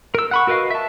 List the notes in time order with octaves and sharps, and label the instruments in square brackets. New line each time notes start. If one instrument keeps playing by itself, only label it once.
[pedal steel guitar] A#4 E6
F#5 B5 C#6
F#4 A#4 B4 D#5 F5
E5 A5